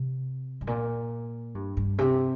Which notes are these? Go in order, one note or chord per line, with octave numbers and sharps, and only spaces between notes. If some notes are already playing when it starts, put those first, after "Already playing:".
Already playing: C3
G2
A#2
G2
G2
C3